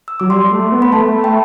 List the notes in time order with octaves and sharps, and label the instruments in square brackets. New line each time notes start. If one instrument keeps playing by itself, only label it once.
[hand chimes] E6
[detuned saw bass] F#3 [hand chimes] D6
[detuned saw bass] G3 [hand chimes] C6
[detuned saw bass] A3
B3
[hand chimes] B5
[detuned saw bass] A3 [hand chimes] A5
[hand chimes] G5